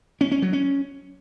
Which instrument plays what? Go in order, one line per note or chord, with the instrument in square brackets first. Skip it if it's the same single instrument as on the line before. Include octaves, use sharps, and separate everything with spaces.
[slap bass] C#4
C#4
F#3
C#4